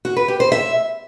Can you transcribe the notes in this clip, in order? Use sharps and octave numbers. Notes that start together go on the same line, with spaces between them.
F#4
B4
G4
C5
E5